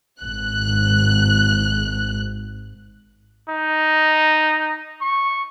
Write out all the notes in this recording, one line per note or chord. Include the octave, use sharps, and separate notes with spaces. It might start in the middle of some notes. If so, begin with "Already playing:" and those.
G#1 F#6
D#4
C#6